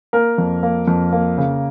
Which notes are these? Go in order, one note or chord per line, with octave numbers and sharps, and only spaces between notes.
A#3 A#4
F2
A#3
F2
A#3
C#3